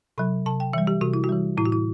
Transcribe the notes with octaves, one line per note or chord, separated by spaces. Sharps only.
C3 F#3 B5
C3 A5
G5
E3 G3 E5
G4
C3 F#4
E4
F#4
E3 G3
A2 E4
F#4
E4